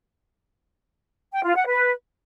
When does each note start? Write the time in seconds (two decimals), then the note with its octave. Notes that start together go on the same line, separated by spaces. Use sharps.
1.32 G5
1.44 F4
1.56 F#5
1.67 B4